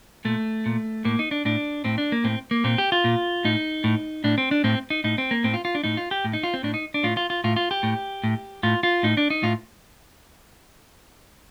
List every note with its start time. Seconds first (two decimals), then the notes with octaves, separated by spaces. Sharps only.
0.25 A#2 A3
0.66 A#2
1.05 A2 A#3
1.19 D#4
1.31 D4
1.45 A2 D4
1.84 A2 C4
1.98 D4
2.12 A#3
2.24 A2 C4
2.51 A#3
2.64 A#2 C4
2.78 G4
2.92 F4
3.04 A#2
3.44 A2 D#4
3.84 A2
4.24 A2 D4
4.38 C4
4.51 D4
4.64 A2 C4
4.90 D#4
5.04 A2 D#4
5.18 C4
5.31 A#3
5.44 A2 C4
5.54 F4
5.65 F4
5.75 D4
5.84 A2 D#4
5.97 F4
6.11 G4
6.25 A2
6.33 D#4
6.43 F4
6.54 C4
6.63 A2 D4
6.74 D#4
6.94 D4
7.03 A2 F4
7.17 F4
7.30 F4
7.44 A2 F4
7.56 F4
7.71 G4
7.83 A2
8.24 A2
8.63 A2 F4
8.83 F4
9.03 A2 D#4
9.17 D4
9.30 D#4
9.43 A2 F4